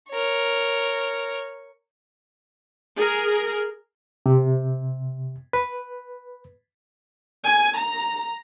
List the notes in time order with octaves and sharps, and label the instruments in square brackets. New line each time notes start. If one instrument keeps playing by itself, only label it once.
[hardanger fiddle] A#4 C#5
[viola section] G#4 A#4
[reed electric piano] C3
B4
[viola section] G#5
A#5